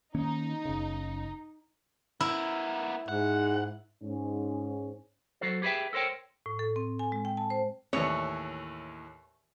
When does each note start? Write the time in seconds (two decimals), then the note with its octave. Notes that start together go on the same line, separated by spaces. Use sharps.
0.15 D#3 A#3 C#4 D#4
0.65 F#1 C#3
2.20 B3 E4 A#4
3.08 G#2 F#5
4.03 G#2 C#4
5.41 F#3 F#4 A4 C5
5.62 G4 G#4 B4 C5 E5 G5
5.93 A4 A#4 C5 C#5 G5
6.46 A2
6.59 A4
6.76 C4
6.99 G#5
7.12 G#3
7.25 G5
7.37 A5
7.50 C5
7.93 D#2 A2 E3 C#5